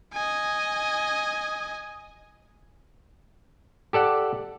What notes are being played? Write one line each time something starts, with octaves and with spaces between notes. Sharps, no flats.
D#5 G#5
G4 A4 D5 F#5